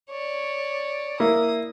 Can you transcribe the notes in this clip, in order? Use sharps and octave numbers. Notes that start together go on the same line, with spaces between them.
C#5 D5
A#3 E4 D#6